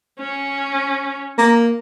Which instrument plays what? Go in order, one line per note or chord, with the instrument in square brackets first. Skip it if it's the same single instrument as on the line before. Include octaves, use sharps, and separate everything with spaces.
[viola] C#4
[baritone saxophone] A#3